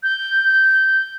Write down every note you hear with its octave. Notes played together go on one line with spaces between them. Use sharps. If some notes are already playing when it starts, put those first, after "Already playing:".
G6